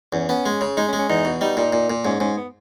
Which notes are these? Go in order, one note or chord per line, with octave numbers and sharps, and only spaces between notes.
E2 C#4
B3 C#4
G#3
C#3
G#3 D#4
C#4
G#3
C#4
E2 D#4
B2
G3 D#4
A#2 D#4
A#2
A#2
G#2 C#4
G#2 C#4
B3